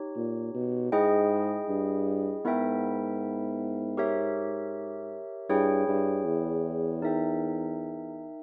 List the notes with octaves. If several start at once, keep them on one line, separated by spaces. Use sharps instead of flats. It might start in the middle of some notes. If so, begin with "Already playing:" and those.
Already playing: D#4 G4 C#5
A#2
B2
G#2 E4 G#4 D#5 G5
G2
G#2 B3 E4 A#4 E5 G5
G4 A#4 C#5 E5
G2 E4 G#4 C#5 G5
G2
E2
D#4 A#4 E5 G5